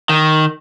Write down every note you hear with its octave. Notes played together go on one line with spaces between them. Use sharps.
D#3